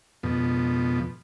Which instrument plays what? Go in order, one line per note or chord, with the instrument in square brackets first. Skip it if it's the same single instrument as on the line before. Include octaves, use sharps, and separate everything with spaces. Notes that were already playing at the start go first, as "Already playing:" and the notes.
[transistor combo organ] F2 B2